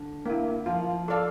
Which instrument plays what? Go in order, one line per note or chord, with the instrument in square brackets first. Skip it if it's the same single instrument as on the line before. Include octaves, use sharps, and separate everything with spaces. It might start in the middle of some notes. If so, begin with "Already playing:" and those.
Already playing: [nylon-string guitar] D3
[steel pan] A#3 E4
[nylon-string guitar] F3 [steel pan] F4
[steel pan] A4 D5 F5